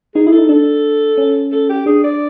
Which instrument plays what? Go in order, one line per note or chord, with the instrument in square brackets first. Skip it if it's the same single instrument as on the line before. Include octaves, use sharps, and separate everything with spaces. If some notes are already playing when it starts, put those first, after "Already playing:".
[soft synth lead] D#4 [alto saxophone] G#4
[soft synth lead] E4 [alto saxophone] G#4
[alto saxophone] A4
[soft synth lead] D#4
[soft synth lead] D4 [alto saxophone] A4
[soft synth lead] C#4
[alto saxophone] A4
G4
[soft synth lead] D4 [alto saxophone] G#4
[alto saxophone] D5